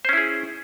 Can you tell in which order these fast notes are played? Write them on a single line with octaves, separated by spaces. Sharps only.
C5 C#4 E4 G#4